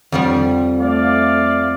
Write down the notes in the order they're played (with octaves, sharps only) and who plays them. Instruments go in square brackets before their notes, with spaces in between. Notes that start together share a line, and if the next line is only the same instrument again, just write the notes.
[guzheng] F2 F3 G3
[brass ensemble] A3 D5 F5